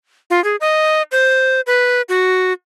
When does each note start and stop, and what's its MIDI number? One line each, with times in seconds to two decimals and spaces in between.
0.30 0.43 65
0.44 0.56 68
0.61 1.02 75
1.12 1.61 72
1.67 2.02 71
2.09 2.53 66